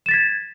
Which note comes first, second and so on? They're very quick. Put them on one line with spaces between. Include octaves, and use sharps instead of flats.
E7 A6 B6 G#6